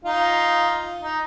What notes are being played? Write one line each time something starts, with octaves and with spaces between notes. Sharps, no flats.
D#4 F4
D#4